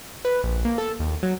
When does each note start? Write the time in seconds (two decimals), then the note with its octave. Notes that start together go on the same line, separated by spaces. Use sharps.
0.25 B4
0.44 A#1
0.65 A#3
0.78 A4
0.99 D#2
1.23 F#3